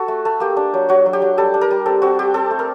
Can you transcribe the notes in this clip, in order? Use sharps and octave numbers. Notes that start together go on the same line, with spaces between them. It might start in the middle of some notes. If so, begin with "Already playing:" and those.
Already playing: F#4 A4
A3
A3
A#3 G4
D4
F#3
F#3 F#4
F#3
G4
F#3
G3 A4
D4
A#4
G3
C4 A4
C4 F#4
C4 G4
C4 A4
A3
A#4